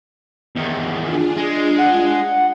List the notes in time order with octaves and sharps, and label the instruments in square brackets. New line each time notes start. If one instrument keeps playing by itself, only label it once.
[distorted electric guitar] E2 D#3
[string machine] D4 F4 G#4
[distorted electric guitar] G#3
[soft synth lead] F#5